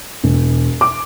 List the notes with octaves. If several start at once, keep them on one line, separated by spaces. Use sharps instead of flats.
E1
D6